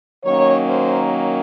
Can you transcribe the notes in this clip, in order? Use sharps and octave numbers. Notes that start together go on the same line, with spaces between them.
D#3 F#3 A#3 C#4 C#5
C5